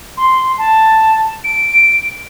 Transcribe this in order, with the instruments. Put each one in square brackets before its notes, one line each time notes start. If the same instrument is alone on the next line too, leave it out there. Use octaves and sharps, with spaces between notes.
[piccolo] C6
A5
D7